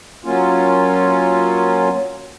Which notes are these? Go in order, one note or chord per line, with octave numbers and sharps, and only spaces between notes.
F#3 A#3 C#4 F4